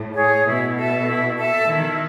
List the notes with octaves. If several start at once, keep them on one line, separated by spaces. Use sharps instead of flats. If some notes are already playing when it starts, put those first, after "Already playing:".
Already playing: A2
G#4 C#5
B2 E4
A4 E5 A5
E4
A4 E5 A5
D#3 E4